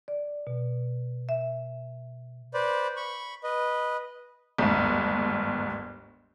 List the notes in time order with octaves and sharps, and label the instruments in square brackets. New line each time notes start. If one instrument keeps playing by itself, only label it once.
[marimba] D5
B2
E5
[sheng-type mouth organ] B4 C5 D5
B5 C#6
B4 D#5
[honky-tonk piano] G1 D#2 G#2